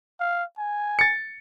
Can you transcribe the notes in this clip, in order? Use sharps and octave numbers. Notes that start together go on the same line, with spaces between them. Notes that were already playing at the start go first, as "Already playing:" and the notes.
F5
G#5
A6 C#7